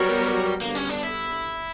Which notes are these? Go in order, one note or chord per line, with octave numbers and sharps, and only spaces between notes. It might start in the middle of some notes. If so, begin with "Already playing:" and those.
Already playing: F#3 G3 B3 F#4 A#4 C#5
D3 G3 A#3 B3
C#4
D4
E4